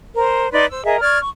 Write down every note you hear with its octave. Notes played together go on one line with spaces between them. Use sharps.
A#4 C5
D#4 B4 D5 C6
C5 E6
G#4 A#4 D#5 E5
D5 C#6 F6 G#6
C#6